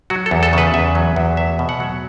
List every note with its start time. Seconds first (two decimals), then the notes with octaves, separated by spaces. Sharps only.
0.10 F#3 F#4
0.26 A4
0.31 E2
0.43 A4
0.53 C#3 B4
0.74 E2 E5
0.95 F#3
1.16 E2
1.37 A3 E5
1.59 B2
1.69 F#5
1.80 F#3